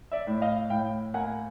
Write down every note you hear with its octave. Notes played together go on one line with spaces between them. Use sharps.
D5 E5
A2
D#5 F5
A2 F5 G5
A#3 F#5 G#5